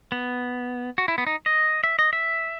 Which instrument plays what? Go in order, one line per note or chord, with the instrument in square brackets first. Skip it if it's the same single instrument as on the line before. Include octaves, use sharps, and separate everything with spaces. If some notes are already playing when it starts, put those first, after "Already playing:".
[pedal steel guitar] B3
F#4
E4
B3
D#4
D#5
E5
D#5
E5